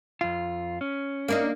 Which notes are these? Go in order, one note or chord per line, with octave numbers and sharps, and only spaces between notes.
F2 F4
C#4
A#3 D4 D#4